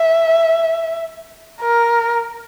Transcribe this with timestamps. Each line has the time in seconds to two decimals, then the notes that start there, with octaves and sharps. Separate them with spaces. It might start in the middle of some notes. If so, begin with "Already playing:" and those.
Already playing: E5
1.61 A#4